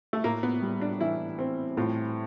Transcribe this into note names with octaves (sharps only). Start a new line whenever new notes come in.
A3
A2 A#3
B3
G3
D4
E3 E4
C4
A2 F4